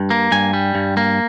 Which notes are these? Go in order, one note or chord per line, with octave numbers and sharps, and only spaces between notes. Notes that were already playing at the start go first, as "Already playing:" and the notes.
Already playing: G2
A#3
G2 G#5
G3
G2
A#3